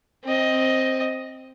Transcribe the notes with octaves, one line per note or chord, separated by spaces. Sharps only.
C4 D#5